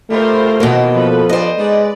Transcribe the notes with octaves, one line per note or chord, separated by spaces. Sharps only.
G3 A3 F4 A#4 C5
B2 D#3 E3 A#3 F#4
F3 A4 B4
G2 C5 D5 D#5
G#3 D#4 B4 D5